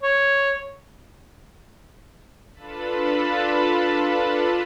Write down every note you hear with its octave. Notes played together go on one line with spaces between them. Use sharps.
C#5
D4 F4 A4 B4 A5 B5